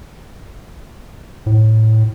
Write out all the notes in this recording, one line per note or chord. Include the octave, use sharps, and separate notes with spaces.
A2